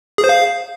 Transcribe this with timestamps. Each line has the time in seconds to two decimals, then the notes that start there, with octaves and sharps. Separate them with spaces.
0.18 G#4
0.24 C5
0.29 F5